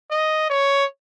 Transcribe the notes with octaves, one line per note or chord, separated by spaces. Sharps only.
D#5
C#5